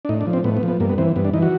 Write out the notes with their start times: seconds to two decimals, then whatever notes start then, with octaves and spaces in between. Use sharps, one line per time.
0.05 D4
0.09 A2 D#4
0.21 D4
0.27 F3
0.33 C4
0.44 A2 B3
0.57 B3
0.63 F3
0.68 B3
0.80 G2 A#3
0.89 B3
0.98 E3 C4
1.16 G2 B3
1.25 D4
1.34 E3 D#4
1.42 F#4